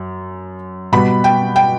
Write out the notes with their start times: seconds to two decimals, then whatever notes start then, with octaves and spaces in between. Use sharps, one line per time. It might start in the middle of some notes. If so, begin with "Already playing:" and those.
Already playing: F#2
0.92 B2 G3 B3 B5
1.24 G5
1.56 G5